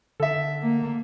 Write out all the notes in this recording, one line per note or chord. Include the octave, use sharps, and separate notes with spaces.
D3 A4 E5
A#3